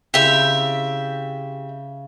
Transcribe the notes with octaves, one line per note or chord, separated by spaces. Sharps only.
C#3 C4 E4 G4 E5